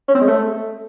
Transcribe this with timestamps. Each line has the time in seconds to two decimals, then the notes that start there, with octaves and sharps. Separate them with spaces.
0.08 C#4
0.15 C4
0.21 G#3
0.27 A3